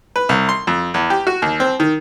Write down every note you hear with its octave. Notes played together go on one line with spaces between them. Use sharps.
B4
C2
C6
F2
E2
G4
F#4
D#2
C4
D#3